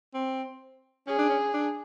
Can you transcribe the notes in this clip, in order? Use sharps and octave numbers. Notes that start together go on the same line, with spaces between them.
C4
C#4 G#4
D4
C#4
D4